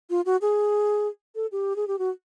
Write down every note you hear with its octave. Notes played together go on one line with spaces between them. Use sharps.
F4
F#4
G#4
A4
G4
G#4
G4
F#4